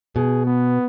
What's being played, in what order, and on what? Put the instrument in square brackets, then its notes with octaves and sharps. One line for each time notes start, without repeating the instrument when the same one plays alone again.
[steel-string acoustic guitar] B2 [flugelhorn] G#4
[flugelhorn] B3